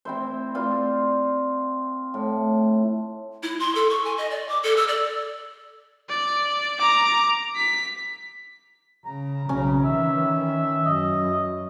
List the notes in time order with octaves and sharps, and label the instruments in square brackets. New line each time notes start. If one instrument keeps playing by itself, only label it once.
[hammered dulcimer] C4 E4 C5
C4 F4 C5 D5
A2
[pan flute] E4
C6
A4
C#6
G#5
D#5
D5
D6
A4
E6
D5
[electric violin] D5
A#5 D6
B6
[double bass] C#3 [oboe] A#5
[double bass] B1 C#3 [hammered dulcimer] C#4
[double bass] D#3 E3 [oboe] E5
[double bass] F#2 [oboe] D#5